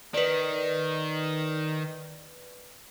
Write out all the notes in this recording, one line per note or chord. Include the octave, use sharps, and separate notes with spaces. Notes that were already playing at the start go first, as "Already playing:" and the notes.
D#3 B4 D5